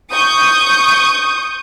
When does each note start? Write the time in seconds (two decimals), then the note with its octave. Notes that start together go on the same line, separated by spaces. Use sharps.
0.12 C#6 D#6 G6